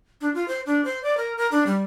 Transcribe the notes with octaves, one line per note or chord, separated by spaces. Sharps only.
D4
F4
C5
D4
C5
D5
A#4
A#4
D4
G3